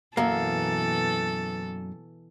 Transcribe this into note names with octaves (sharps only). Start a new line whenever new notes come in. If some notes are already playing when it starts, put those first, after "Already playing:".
F#2 B2 E3 A#3 A4